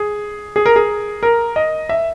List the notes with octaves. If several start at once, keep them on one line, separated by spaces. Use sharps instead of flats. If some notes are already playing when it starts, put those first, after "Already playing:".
Already playing: G#4
G#4
A#4
G#4
A#4
D#5
E5